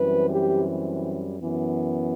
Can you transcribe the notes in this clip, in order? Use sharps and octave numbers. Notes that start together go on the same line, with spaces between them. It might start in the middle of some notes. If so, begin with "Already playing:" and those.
Already playing: F#2 E3 G3 C4 B4
G4
F#2 E3 B3